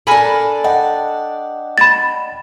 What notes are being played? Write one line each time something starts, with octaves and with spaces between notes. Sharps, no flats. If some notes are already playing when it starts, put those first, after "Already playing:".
D4 A4 A#4 G#5 B5
D5 D#5 F#5 G5
B5 A6